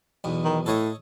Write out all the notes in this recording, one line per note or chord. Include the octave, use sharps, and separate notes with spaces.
B1 E2 B2
D#3
A2 A4 C#5 D#5